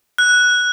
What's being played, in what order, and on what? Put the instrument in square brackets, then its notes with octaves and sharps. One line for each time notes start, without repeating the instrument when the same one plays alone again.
[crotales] F#6